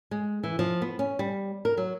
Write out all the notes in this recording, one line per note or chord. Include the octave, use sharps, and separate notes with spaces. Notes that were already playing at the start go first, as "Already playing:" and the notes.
G#3
E3
F3
B3
C#4
G3
A#4
F#3